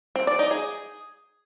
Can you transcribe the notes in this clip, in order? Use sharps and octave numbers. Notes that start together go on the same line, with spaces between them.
C4
D5
D#4
G#4